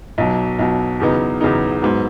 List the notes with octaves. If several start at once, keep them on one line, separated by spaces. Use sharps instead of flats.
B1 B2 F#3
B1 B2 F#3
E2 C#3 F#3 B3 D#4
E2 C#3 F#3 B3 D#4
G#2 F#3 B3